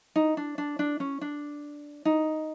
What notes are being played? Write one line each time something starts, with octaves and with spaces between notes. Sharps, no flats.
D#4
D4
D4
D4
C#4
D4
D#4